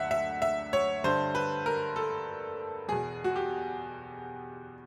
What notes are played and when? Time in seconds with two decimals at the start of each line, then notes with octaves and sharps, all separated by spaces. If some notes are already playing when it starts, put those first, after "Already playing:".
Already playing: D2 D3 E5 F#5
0.11 E5
0.42 E5
0.73 C#5
1.04 G2 D3 C5
1.35 B4
1.66 A#4
1.96 A4
2.88 E2 B2 G#4
3.24 F#4
3.36 G4